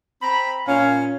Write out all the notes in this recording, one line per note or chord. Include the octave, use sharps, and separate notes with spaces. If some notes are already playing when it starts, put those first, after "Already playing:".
C4 A#5 B5
A#2 C#4 C#5 F5